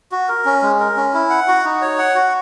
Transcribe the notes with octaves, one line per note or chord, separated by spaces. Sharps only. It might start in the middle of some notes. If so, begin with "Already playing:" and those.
F#4
A#4
C#4
G#3
A#4
C#4
E4
F#5
F#4
D#4
C#5
F#5
F#4